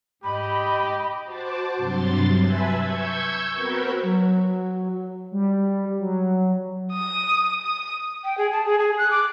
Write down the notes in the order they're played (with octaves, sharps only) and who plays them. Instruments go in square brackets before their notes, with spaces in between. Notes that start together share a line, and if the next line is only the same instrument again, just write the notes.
[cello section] G#2 D#5 [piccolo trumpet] G4 [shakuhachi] B5
[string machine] F#4 C5 A5 D6
G2 C3 F#3 C6 A6
B4 E5 G#5 A5 B5 G#6
C#6 E6 G6 G#6
B3 C4 F#4 A#4 B4
[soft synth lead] F#3
G3
F#3
[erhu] D#6
D#6
[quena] G5
G#4
A5
G#4
G#4
F#6
D6